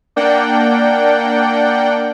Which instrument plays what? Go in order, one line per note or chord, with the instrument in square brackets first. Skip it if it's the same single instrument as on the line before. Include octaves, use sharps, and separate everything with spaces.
[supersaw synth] A#3 D4 D5 F#5 G5